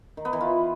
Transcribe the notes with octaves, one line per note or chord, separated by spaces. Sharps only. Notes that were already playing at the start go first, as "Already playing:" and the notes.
D#3
B3
E3
F4